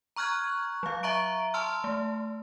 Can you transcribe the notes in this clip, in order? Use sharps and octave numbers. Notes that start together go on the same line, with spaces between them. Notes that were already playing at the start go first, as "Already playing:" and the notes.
A#5 C#6 F6 F#6 G#6
F#3 F5
E5 A#5 C#6 D7
A5 C6 E6 F6
A3